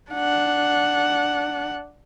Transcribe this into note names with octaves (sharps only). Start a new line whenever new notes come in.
D4 F#5